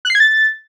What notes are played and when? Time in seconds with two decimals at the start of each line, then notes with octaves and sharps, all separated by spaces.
0.05 F#6
0.10 C7
0.15 G#6
0.20 A6